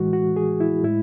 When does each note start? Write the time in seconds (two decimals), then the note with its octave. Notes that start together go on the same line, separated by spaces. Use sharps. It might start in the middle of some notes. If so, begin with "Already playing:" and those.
Already playing: A2 E3 G#3 F#4
0.13 F#4
0.36 G#4
0.60 E4
0.84 A2 G#3 E4